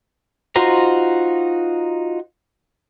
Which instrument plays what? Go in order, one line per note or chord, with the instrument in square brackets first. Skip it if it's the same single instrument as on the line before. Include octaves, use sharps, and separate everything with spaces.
[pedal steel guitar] D#4 F4 F#4 C5 A#5